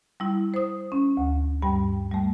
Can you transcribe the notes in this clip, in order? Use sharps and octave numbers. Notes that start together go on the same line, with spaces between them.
G3 E4
C5 D#6
C#4
D2
G2 G3 G5
G3 A3